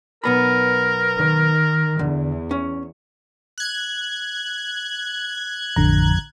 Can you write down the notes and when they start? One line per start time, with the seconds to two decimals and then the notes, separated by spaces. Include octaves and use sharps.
0.24 B1 B3 A#4 B5
1.17 D#3
1.99 E2 D3
2.51 C#4
3.58 F#6 G#6
5.76 A1 F2 D3 A#5